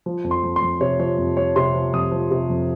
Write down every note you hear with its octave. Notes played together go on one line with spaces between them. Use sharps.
F3
F2
C6
F2
C6
F2
C3 C#5
F3 C#5
F2
F3 C#5
C3 C6
F3
F2 D#6
F3
C3
F2